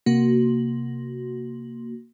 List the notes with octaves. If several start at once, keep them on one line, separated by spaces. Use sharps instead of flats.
C3 A#3 F#4